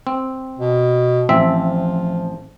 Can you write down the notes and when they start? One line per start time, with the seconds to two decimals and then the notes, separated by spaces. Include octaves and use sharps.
0.07 C4
0.59 B2
1.29 A1 F3 C4 E5